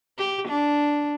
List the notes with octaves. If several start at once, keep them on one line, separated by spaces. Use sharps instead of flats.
G4
D4